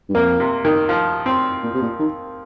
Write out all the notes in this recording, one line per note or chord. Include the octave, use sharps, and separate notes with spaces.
G2
F2 A#3
C3
D#3
F3
C4
A#2
C3
A#2
D#3